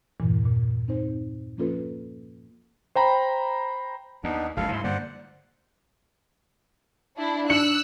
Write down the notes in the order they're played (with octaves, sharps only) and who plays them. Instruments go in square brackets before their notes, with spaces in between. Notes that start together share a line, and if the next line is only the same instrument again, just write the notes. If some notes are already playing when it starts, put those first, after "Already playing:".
[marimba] E2 G2 A#2 D3 E3
A#2
C4 D#4 C5
F3 A#3 C#4 F4 A4 B4
[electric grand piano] C5 G5 A#5 B5
[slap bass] D#2 [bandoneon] B3 D4 D#4
[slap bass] F#1 C#2 F#3 [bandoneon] A4 F5
[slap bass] G#2 [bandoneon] E4 C6
[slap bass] G2 D3 A#3 [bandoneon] C5 D5 F#5
[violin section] D4 E4
[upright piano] D4 C#7 F#7 [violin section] E6 F#6